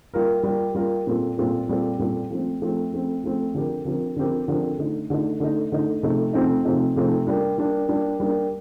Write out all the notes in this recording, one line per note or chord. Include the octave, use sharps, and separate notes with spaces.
G3 A#3 F4 A#4
G3 A#3 F4 A#4
G3 A#3 F4 A#4
A#2 G3 C4 F4 A4
A#2 G3 C4 F4 A4
A#2 G3 C4 F4 A4
A#2 G3 C4 F4 A4
F3 A3 C4
F3 A3 C4
F3 A3 C4
F3 A3 C4
D3 F3 C4 G4 A#4
D3 F3 C4 G4 A#4
D3 F3 C4 G4 A#4
D3 F3 C4 G4 A#4
D3 A3 D#4
D3 A3 D#4
D3 A3 D#4
D3 A3 D#4
C3 F3 A3 C4 D#4
C3 F3 A3 C4 D#4
C3 F3 A3 C4 D#4
C3 F3 A3 C4 D#4
G3 A#3 D4
G3 A#3 D4
G3 A#3 D4
G3 A#3 D4